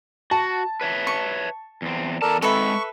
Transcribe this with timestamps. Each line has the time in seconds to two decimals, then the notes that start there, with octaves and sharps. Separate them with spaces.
0.31 F#4 A5
0.81 B4 C#5 E5
1.07 C#6
1.82 E2 C4
2.22 E2 A4 A#4 D5 A5
2.42 G#3 C4 A4 B4 E5 C#6